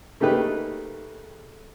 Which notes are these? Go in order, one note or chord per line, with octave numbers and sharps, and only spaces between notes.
C#3 A3 A#3 D#4 G4 B4